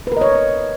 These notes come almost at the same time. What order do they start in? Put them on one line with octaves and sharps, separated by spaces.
B4 A#4 D#5 C#5